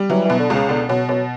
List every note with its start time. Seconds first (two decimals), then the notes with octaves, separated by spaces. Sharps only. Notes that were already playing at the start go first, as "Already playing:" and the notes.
Already playing: G3
0.10 E3 F#3
0.25 E3
0.30 B2
0.39 D3
0.50 C#2 C#3
0.69 B2 D3
0.89 B2 F#3
1.09 B2 F#3